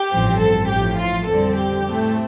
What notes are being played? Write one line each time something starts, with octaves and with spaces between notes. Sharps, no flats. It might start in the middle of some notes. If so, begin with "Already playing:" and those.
Already playing: G4
A1 G2 F3 C4
A4
A1 A2 F3 G4
F4
F2 D3 G3 C4 A4
G4
A2 A3 C4